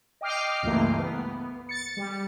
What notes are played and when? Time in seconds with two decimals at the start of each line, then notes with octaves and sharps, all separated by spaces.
0.21 D#5 G5 D6 F6 C7
0.63 C#2 G2 E3 A3 A#3
0.98 B3
1.69 A6 C#7
1.97 G3